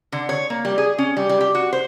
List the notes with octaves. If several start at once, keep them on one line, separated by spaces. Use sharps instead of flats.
D3
C#5
A#3
G3
G#4
C#4
G3
G3
G4
F#4
C5